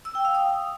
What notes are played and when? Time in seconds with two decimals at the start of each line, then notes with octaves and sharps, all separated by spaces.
0.05 E6
0.15 G5
0.25 F5
0.35 D#6